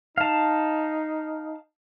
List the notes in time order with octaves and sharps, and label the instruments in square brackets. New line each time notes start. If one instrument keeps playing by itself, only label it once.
[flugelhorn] D#4 [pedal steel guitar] F5 A5